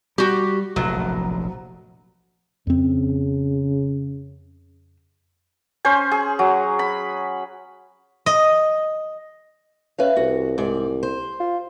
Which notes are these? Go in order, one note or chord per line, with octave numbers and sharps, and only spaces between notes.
G3 F#4 G4
F1 A#1 A2 F#3
F2 C#3 C4
C#4 C5 G#5
G#4
F#3
B5
D#5
C#4 B4 E5 F5
C2 F#4
C2 G#2 D5
C5
F4